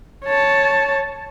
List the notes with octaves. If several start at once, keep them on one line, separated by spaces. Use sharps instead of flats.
C#5 A5